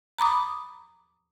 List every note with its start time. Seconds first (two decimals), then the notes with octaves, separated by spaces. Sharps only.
0.18 A#5 B5 D6 D#6